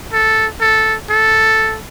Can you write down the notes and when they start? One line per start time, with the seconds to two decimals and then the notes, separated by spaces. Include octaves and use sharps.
0.13 A4
0.61 A4
1.09 A4